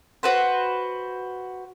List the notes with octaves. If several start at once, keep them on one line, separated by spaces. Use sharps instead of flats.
F#4 B4 C5